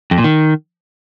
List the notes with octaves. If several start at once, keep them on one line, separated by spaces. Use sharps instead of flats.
F2
A#2
D#3